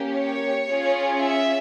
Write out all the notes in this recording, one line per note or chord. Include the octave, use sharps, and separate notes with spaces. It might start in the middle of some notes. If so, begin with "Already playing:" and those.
Already playing: A#3 C#4 G4
C#5
C#4 F4 G#4
E5